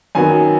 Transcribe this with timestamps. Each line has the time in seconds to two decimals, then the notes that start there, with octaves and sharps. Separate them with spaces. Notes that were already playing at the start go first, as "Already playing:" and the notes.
0.15 F#2 D#3 F#3 B3 G#5